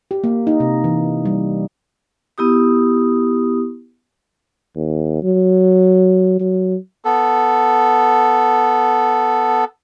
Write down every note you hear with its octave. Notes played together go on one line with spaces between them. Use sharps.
G4
A#3
D#4
C3
E3
G3
B3 E4 G4 D#6
D#2
F#3
F#3
B3 A4